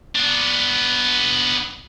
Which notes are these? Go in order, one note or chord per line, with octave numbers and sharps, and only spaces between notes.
B3 D4